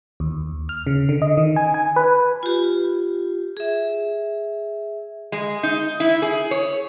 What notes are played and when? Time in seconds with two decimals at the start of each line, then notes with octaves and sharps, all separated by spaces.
0.20 D#2
0.69 F6
0.87 C#3
1.09 D3
1.22 D#5
1.37 D#3
1.56 G#5
1.74 G#5
1.96 B4
2.43 F4 G4
3.57 G#4 E5
5.32 G#3
5.63 D#4
6.00 E4
6.22 G#4
6.51 C#5